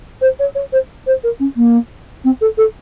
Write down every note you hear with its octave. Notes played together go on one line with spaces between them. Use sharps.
C5
C#5
C#5
C5
C5
A#4
C#4
A#3
C4
A4
A4